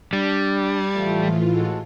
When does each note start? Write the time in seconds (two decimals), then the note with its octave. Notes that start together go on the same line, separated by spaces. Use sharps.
0.13 G3 D4
0.54 D5 A5 G#6
0.95 A2 E3 F3 A3 F4
1.53 G#3 F#4 A4